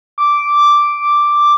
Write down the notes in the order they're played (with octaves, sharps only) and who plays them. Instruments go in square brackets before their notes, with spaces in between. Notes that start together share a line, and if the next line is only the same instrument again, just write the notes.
[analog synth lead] D6